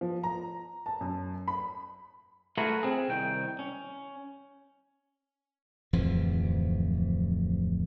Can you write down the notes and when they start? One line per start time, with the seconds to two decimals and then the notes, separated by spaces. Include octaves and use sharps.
0.01 F3
0.23 A#5
0.86 A5
1.01 F#2
1.48 B5
2.58 A3 F4 F#4 G#4 A#4 B4
2.83 C4 G#4
3.08 C2 D#3 G5
3.59 C#4
5.93 D1 F2 E3 F3